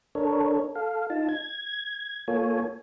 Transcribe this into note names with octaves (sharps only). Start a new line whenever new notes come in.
D4 A4 A#4 C#5
A4 F5
D#4 F4 A5
G#6
A#3 F4 A4 C#5 G#5